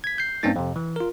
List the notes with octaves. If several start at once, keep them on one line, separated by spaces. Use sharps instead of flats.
G#6 B6
G6 C7
G2 A#3 C4 C#4 D#4 A6
F2 C3
E3
F4 A#4